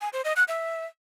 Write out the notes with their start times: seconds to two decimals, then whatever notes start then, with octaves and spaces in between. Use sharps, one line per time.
0.01 G#5
0.13 C5
0.25 D#5
0.36 F#6
0.48 E5